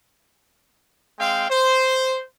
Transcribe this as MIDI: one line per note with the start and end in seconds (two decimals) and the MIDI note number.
1.19 1.46 56
1.19 1.46 60
1.19 1.46 77
1.19 1.46 79
1.50 2.23 72